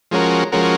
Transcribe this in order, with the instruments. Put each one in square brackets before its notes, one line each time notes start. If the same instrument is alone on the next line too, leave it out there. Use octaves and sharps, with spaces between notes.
[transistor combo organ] F3 G#3 C#4 F#4 A#4
F3 G#3 C#4 F#4 A#4